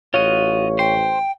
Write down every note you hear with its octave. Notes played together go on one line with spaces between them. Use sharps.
A1 F4 F#4 C#5 D#5 F5 C#6
C5 G5 C6